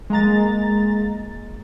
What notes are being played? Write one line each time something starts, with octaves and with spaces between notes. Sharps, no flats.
G#3 A#3 A#5 A6